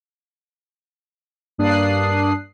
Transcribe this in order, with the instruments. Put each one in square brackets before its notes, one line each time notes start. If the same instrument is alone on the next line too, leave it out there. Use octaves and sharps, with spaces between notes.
[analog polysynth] G2 A#3 D4 D#6 F#6 C7